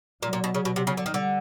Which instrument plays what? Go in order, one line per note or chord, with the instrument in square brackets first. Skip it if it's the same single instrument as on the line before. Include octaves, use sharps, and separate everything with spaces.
[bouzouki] A#2 [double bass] F#3
[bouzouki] A#2
B2
C#3
B2
C3
C#3
D3
[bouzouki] D#3 [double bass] G3
[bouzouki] D3